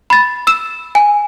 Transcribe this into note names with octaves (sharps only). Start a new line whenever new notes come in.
B5 A6
E6 E7
G#5